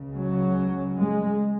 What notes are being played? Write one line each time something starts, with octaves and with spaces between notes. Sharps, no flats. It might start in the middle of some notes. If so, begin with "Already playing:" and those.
Already playing: C#2 C#3
F#3
G#3